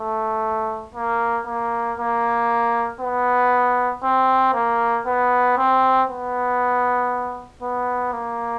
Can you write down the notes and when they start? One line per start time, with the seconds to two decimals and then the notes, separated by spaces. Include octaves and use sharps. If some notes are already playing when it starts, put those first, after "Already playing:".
Already playing: A3
0.95 A#3
1.47 A#3
1.98 A#3
3.01 B3
4.04 C4
4.54 A#3
5.06 B3
5.57 C4
6.09 B3
7.62 B3
8.13 A#3